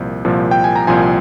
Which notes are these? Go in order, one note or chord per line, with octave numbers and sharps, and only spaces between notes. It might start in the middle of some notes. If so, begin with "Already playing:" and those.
Already playing: C2 A#2 F3
C2 A#2 F3
G5
G#5
A#5
C2 A#2 F3 G#5 C6